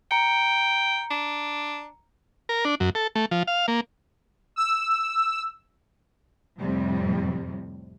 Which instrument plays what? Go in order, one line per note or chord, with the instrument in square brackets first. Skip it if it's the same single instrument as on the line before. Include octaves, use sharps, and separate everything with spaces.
[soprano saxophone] G5 [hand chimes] A#5 C#7
[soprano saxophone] D4
[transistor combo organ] A#4
D4
F#2
A4
A3
F3
F5
A#3
[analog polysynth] E6
[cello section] F2 A2 C3 G3